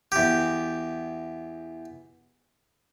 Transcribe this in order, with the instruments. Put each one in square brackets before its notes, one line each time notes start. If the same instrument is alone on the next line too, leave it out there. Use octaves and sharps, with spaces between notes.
[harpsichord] E2 G4